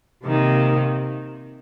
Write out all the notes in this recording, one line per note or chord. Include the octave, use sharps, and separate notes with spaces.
C3 D#3 A#3